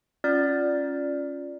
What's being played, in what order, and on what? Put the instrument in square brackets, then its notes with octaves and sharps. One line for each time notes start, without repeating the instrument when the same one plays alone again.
[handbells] C#4 F4 D5 F6 A6